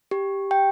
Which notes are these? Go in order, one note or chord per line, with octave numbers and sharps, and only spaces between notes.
G4
G5